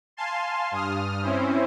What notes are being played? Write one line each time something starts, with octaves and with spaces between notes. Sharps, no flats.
F5 G#5 A5 C6
G2 D#6 F6
C4 C#4 E4 C5